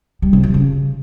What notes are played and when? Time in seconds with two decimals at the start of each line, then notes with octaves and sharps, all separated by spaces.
0.22 G3
0.33 C3
0.43 F3
0.54 C#3